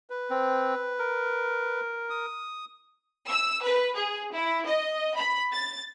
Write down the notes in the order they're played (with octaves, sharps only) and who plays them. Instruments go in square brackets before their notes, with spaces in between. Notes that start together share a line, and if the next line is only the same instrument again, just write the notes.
[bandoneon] B4
[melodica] C4
A#4
[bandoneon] D#6
[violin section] E6
B4
G#4
E4
D#5
B5
A6